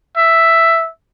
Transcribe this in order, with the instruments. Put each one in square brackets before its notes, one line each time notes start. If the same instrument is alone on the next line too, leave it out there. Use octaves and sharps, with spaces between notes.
[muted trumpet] E5